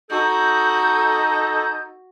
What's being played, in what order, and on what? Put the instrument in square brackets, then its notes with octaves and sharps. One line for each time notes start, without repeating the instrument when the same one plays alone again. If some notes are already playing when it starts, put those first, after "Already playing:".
[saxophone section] D#4 A4 [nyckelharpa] F#4 [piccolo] G6